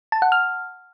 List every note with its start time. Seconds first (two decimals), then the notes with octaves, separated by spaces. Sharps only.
0.12 A5
0.22 F#5
0.32 F6